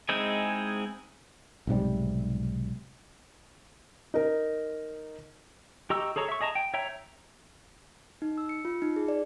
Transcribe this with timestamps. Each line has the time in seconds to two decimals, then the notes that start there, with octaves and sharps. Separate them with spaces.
0.09 G#3 C4 D#4 E4 G#4
1.67 B1 G#2 C3 G3
4.14 D#4 A#4
5.90 G4 D#5 A#5 C#6 E6
6.16 G#4 A4 C#5 A#5 C#6
6.29 E5 C#6
6.41 G#4 D#5 A5 A#5
6.55 G5
6.74 C#5 E5 G5 A#5
8.22 D#4
8.38 E6
8.49 C#7
8.65 F4
8.82 D#4
8.96 G#4
9.08 D5